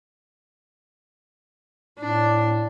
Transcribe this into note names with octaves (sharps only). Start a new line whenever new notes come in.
A2 D4